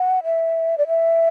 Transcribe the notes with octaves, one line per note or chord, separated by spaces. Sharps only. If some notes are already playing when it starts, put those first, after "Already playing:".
Already playing: F#5
E5
D5
E5